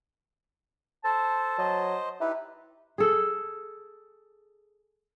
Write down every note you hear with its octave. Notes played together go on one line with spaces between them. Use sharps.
A4 C5 A5
F#3 C5 D#5
D#4 E4 G4 B4
G#4 A4